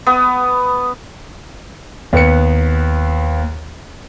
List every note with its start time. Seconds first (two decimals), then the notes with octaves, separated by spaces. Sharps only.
0.07 B3
2.13 D#2 B3 B4 C#7